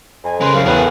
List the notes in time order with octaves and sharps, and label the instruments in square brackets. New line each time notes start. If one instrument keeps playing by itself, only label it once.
[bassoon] F2 [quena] G#5
[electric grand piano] C#3 [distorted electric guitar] A#4 B4 [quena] C6
[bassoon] C2 [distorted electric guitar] F#2 [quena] F5
[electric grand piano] E2 B4 F#6 [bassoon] A2 [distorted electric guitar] G#4 A#4